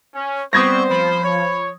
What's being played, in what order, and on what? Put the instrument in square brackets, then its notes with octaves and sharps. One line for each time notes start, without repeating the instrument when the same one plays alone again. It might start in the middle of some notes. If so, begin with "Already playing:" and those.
[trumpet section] C#4
[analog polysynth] G3 B3 C4 [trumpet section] C5 [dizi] C#6 [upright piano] D#6 G#6 A#6
[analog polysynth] F3 [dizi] B5
[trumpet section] C#5